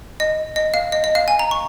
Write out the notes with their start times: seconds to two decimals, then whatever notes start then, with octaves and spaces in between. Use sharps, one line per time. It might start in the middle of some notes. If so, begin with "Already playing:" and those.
0.20 D#5
0.56 D#5
0.74 F5
0.92 D#5
1.04 D#5
1.15 F5
1.28 G#5
1.39 A#5
1.51 C#6